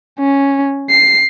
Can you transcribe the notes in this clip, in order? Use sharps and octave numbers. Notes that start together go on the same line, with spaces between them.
C#4
C7